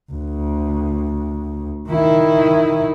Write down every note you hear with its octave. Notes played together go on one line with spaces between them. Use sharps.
D2
D#3 E4